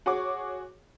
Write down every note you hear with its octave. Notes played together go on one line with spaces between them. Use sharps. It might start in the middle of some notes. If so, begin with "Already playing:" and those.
F#4 G#4 C#5 C#6 D6